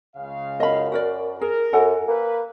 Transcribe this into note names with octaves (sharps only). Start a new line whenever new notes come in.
C#2 C#3 F5
F#2 D#5 B5
F#4 A#4 D5
G#4 A#4
F#2 A4 F#5 G#5
A#3 B4